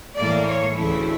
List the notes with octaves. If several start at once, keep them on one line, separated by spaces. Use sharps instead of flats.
A2 E3 A#3 D5
C#5
D2 C#3 E3 A3 E4